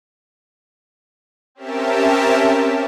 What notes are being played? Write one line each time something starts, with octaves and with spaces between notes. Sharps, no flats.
C4 C#4 G4 A#4 E5 A5